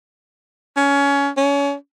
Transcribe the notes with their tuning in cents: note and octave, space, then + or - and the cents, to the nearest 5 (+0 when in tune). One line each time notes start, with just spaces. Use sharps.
C#4 +20
C#4 +30